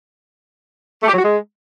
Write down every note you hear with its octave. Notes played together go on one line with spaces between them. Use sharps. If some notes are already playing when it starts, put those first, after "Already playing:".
A3
G4
F#3
F#4
G#3